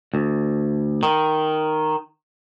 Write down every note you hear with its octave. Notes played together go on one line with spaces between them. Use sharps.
D2
D#3